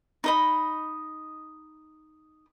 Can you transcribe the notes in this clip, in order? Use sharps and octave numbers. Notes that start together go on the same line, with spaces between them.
D#4 D#5 B5